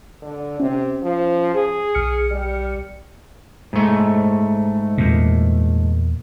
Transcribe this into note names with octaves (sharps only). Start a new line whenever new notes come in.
D3
C3 C#4
F3
G#4
B1 F6 C#7
G3
G#2 A3
E2 A#2